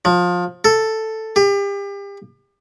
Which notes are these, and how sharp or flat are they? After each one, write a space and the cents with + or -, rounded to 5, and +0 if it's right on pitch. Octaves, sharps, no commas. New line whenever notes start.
F3 +25
A4 +5
G4 +35